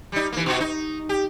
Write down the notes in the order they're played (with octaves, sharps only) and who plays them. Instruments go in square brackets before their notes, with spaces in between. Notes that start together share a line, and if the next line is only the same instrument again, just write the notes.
[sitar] G3 D#4
E3 A#3
B2 F#4
D#4
G4